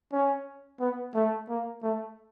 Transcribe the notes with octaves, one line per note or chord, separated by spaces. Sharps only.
C#4
B3
A3
A#3
A3